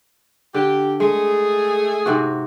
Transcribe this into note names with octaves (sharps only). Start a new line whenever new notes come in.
D3 G4
G#3 A3 G#4
G#2 C3 F#4